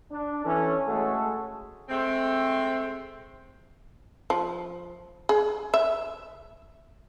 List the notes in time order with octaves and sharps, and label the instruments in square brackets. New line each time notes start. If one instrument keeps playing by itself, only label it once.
[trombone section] D4
E3 C#4 A4
G#3 A3 C#4 F#4 G#4 A4
[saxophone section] G#3 A3 C4
[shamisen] F3
G#4
E5